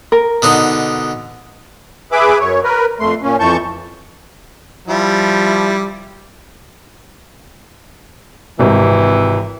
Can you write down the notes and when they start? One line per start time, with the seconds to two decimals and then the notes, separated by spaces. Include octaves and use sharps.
0.12 A#4
0.42 B2 D3 D#4
2.12 G#4 B4 E5 B5 D6
2.40 F#2 C#5
2.64 A#4 B4
3.00 F2 A3 C6
3.22 A#2 C#4
3.40 F2 E3 A5 C#6 G6
4.88 F3 G3 E4
8.59 G#1 C3 E3